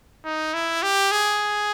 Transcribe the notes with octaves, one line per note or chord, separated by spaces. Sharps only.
D#4
E4
G4
G#4